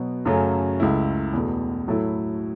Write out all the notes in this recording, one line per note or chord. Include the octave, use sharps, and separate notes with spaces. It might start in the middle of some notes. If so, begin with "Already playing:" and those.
Already playing: B2 F#3 B3
F#2 C#3 F#3 A3 C#4
C#2 C#3 A3 E4
E2 B2 A3
A2 F#3 A3 E4